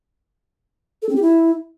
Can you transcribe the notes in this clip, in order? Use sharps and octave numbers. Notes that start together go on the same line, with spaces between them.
A4
C4
G4
E4